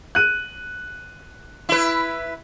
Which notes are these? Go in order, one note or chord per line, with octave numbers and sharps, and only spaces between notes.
F#6 D#7
E4 B4